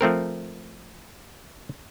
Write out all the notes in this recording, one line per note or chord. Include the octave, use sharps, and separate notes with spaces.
F3 A3 C4 A#4